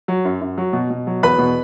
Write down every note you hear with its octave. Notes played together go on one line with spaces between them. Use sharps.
F#3
F#2
F#2
F#3
B2
B2
F#3
E2 B4 B5
B2